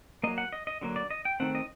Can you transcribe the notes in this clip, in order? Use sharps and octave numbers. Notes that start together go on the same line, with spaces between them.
F#3 A#3 D#5
F#5
D#5
D#5
D3 F#3 A#3
D5
D#5
G5
D#3 A3 C4 F#5
D#5